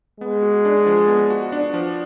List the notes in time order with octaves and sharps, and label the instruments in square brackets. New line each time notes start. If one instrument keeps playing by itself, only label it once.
[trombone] G#3 [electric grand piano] B3
[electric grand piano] F#4
D4
F3
B3
F#4
D4
F3